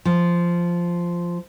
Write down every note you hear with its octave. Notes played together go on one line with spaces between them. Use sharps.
F3